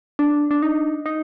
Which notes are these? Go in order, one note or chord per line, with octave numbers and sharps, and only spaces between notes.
D4
D4
D#4
D#4